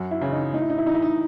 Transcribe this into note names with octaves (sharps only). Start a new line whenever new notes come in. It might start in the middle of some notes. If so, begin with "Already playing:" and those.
Already playing: F#2 F#4
E4
C#3 E3
D#4
A2 D#4
E4
D#4
E4
E3 D#4
E4
D#4